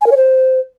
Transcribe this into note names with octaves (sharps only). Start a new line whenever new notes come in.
G#5
A#4
C#5
C5